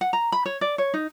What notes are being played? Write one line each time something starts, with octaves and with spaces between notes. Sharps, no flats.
F#5
A#5
B5
C#5
D5
C#5
D#4